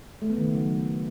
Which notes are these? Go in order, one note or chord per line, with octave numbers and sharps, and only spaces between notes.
A3
B3
D#3
C#3
F#3